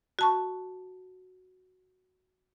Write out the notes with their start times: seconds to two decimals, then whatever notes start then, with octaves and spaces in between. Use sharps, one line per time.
0.19 F#4 A5 C#6